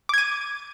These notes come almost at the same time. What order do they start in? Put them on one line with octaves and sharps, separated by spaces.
D6 G#6 D#7